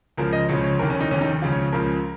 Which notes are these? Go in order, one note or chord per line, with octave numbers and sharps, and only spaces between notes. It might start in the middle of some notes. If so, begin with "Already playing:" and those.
C#2 C#3 F3 A#4
D#5
C#2 C#3 F3 C#5
C#5
F1 D#2 D#3 A#4
C#4
D#4
F1 D#2 D#3 C#4
D#4
C#2 C#3 F3 F4
C#5
C#2 C#3 F3 A#4